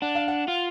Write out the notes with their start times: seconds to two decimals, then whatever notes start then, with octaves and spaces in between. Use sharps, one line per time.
0.02 D4 F#5
0.15 F5
0.28 F#5
0.48 F4